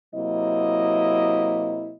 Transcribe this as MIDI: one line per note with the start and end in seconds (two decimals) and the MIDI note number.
0.15 1.96 48
0.15 1.96 54
0.15 1.96 58
0.15 1.96 64
0.15 1.96 75